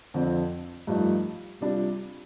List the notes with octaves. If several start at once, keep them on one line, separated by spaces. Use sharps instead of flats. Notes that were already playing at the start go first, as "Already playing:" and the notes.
F2 D3 F3 C4 F4
G2 F3 A3 D#4
C3 G3 D4 F4